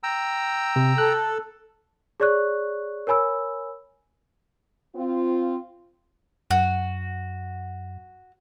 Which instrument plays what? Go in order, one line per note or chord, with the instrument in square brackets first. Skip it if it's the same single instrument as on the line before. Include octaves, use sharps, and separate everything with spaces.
[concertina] G5 A#5 E6
[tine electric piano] C3
[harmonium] A4 [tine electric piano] F#6
[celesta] G#4 C#5 D5 C#6 F#6
A#4 C#5 G#5 B5 E6
[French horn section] C4 F4
[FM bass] F#2 [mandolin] F#4